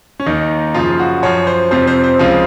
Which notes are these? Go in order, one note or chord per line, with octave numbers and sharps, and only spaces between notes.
C#4
D#2 D#3 D#4
F#2 C#3 F3 F4
F#4
F#2 F3 C#5
C5
F2 C3 F3 C5
C5
C5
C#2 C#3 F3